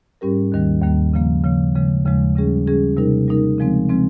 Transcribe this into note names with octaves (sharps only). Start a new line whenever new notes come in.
G#2 G3 C#4 G4 A#4
D#2 D#3 G3 A#3
D#2 D#3 G3 A#3
C#3 F3 A#3
C#3 F3 A#3
D#2 C#3 F3 G#3
D#2 C#3 F3 G#3
C#3 G3 C#4 G#4
C#3 G3 C#4 G#4
C3 G3 A#3 D#4 A#4
C3 G3 A#3 D#4 A#4
C#3 F3 G#3 C4
C#3 F3 G#3 C4